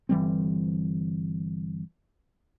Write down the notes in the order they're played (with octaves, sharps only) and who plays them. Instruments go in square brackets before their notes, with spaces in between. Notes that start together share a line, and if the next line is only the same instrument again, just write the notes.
[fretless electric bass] G1 E3 G3 C4